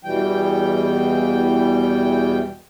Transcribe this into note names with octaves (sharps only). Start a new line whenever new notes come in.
E2 B2 E3 G3 G5